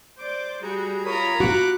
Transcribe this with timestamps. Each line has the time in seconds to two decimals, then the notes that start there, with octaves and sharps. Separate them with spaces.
0.18 C5 D5 D6
0.62 G3 F#4 G#4 A#5
1.06 F4 A#4 C#5 A#5 B5 D#6
1.40 F#4 D6 F#6